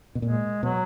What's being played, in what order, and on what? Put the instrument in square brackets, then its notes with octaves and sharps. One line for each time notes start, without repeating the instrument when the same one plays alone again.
[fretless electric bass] B2
[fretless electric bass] A#2 [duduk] G#3
[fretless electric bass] B2 [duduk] F#3